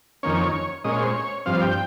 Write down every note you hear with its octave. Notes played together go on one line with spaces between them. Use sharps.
F2 D#3 A#3 C#4 C#5
A#2 G#3 C#4 D#5
C#5
C5
C#5
G2 F3 C4 F5
G5